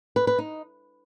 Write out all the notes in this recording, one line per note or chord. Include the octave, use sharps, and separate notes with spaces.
B4
B4
D#4